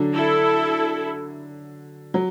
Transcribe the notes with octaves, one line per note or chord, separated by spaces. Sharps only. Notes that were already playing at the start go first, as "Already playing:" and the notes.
Already playing: D3 F#3 D4
E4 A4
F#3